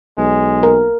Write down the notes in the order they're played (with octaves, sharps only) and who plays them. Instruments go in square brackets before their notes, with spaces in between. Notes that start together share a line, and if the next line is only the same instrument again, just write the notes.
[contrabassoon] B1 [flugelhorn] G#3
[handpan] A#4